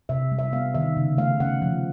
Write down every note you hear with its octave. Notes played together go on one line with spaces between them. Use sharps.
C3 E5
G3
E5
B3 F5
D#3 E5
C#3
A3 F5
C#4 F#5
F3